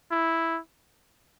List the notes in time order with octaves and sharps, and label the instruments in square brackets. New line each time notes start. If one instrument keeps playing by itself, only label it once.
[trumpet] E4